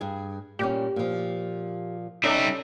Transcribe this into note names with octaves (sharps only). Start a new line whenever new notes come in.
G2 G#4
A#2 G3 C#4 G4
A#2 F3
G3 C#4 D#4 A4 D5 E5